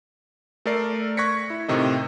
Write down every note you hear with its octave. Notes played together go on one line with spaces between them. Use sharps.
A3 A4 A#4 D5 C7
C#6 F#6 G#6 A#6 B6 C#7
E4
A2 C3 D#3 D#5